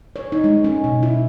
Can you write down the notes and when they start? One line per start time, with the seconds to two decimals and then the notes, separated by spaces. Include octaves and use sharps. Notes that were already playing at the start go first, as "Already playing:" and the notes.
0.16 C#5
0.32 D#4
0.44 G#3
0.64 C#4
0.84 B2
1.03 E4